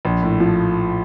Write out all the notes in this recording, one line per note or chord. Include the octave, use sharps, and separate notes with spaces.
A#1
A2
F3